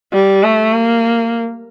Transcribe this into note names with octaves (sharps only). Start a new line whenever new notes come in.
G3
A3
A#3